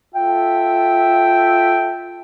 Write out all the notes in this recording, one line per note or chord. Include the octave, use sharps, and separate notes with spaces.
F4 A4 E5 G5